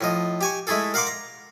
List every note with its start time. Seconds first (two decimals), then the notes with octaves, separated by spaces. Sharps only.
0.01 A2 F3 D#5
0.41 G4 G#5 C#6
0.67 G#3 A3 E4 G#4 A4
0.94 A#4 F5 F#5 A#5 C6 D6
1.07 A#5